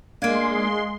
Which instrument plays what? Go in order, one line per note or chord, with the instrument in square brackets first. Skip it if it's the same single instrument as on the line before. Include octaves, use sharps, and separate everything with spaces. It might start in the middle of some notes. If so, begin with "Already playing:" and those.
[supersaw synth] G#3 C6 [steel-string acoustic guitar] A#3 D4 [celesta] F5 G#6 D7